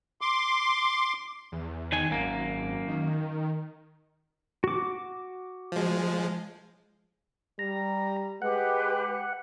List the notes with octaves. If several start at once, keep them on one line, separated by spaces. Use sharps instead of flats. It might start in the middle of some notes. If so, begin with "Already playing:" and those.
C6 D6
E2
D#3 G#5
G#1 F#2 A#3
D#3
F#4 D6
F3 G#3
G3 A#5
G#3 G4 B4 F#5